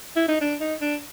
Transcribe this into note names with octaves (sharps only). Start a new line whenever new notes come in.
E4
D#4
D4
D#4
D4